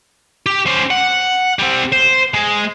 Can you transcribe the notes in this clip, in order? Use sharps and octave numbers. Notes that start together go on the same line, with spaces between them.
G4
C#4 C5
F#5
G3 C4
C5
G#3